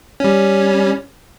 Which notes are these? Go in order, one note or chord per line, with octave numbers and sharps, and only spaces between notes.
G3 C#4